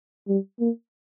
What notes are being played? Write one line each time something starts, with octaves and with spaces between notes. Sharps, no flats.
G3
A#3